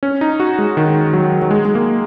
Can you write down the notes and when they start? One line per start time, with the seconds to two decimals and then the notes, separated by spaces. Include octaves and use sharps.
0.03 C#4
0.21 D#4
0.40 F#4
0.58 G#3
0.77 D#3
1.13 F#3
1.42 F#3
1.51 G#3
1.65 G#3
1.75 A#3